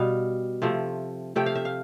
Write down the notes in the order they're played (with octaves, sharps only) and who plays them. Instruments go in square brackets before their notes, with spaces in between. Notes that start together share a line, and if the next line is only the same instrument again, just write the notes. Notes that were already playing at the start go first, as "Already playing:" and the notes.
Already playing: [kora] B2 G3 F5
C3 F3 A3
C3 F3 A3 G5
F5
E5
F5